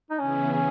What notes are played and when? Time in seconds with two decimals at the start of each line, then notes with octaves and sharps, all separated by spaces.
0.10 D#4
0.19 C#3 E3 B3 C#4 E4 G#4
0.53 C#4